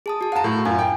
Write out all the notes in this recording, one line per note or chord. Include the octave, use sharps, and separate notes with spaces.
G#4 A5 D#6
F#4 A5
F5 F#5 A5 A#5
A2
F#2 F4 G#5
G5